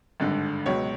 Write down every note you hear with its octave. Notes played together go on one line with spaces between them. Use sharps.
G#1 G2 D3
C#2 B2 F#3 C#5